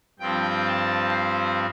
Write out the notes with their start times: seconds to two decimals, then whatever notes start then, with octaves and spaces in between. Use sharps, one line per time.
0.19 G2 F3 C4 G5
0.65 A5
1.11 C5